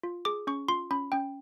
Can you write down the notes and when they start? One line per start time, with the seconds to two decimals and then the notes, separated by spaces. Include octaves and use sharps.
0.03 F4
0.25 G#4 D6
0.47 C#4 C#6
0.68 F4 C6
0.91 C#4 B5
1.12 C#4 G5